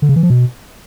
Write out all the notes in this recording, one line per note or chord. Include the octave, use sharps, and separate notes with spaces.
D3
C#3
E3
F3
B2